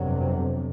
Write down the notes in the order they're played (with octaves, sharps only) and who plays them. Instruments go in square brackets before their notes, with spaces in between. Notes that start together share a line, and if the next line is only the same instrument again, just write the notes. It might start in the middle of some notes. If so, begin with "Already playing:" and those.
Already playing: [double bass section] G1 F2 C3 F#3